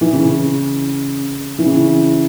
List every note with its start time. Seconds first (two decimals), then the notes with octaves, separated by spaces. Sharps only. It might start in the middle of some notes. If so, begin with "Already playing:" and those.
0.01 E3
0.13 C#3
1.58 E3
1.66 C#3